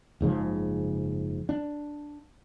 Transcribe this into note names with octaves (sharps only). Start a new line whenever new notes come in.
F#1 G#2 C#3 F3
D4